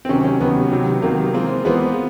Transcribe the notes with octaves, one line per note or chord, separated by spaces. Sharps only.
C4
C3 D#3 F#3 C#4
C#4
C3 D#3 F#3 B3
C3 D#3 F#3
C3 D#3 F#3 A#3
E3 G#3 C4 F4
E3 G#3 B3 C4 F4